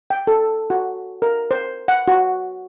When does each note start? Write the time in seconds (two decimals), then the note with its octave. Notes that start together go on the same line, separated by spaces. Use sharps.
0.10 G5
0.27 A4
0.70 F#4
1.22 A#4
1.51 C5
1.88 F#5
2.08 F#4